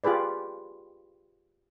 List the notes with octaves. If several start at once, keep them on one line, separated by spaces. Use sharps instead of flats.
F4 G4 G#4 B4 D5